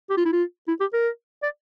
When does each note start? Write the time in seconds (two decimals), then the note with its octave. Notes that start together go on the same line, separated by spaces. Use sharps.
0.10 G4
0.17 F4
0.25 E4
0.32 F4
0.68 E4
0.80 G4
0.93 A#4
1.43 D5